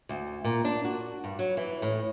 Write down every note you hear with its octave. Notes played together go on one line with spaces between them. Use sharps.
D2
A#2
D4
F#4
G2
F#3
E3
A2